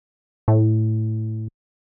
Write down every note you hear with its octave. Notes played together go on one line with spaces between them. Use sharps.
A2